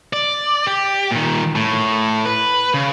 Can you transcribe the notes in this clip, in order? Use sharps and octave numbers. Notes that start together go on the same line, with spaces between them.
D5
G4
A#2 D#3
A2
B4
C#3